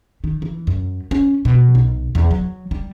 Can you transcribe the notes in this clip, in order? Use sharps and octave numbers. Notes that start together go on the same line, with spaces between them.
D#3
E3
F#2
C#4
B2
B1
E2
F#3
G3